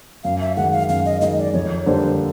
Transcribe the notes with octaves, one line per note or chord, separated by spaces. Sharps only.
F#2 F5
E5
D#3 G#3 F#5
F5
F#2 F5
D#5
D#3 G#3 D#5
D5
F2 C#5
D3 G3 A#3 D4 C5